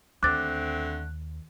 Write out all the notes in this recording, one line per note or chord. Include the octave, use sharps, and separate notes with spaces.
D#2 D3 A3 C4 D6 F#6 A6